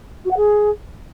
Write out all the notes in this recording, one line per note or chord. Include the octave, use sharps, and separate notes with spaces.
F#4
F#5
G#4